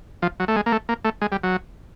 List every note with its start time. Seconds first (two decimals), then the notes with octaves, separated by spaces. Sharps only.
0.22 F3
0.40 F#3
0.48 A3
0.56 G#3
0.66 A#3
0.72 A3
0.89 A#3
1.04 A3
1.22 G#3
1.32 G3
1.43 F#3